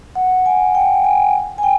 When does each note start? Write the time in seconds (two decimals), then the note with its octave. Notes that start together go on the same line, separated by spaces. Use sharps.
0.15 F#5
0.46 G#5
0.75 G5
1.05 G#5
1.58 G#5
1.63 G5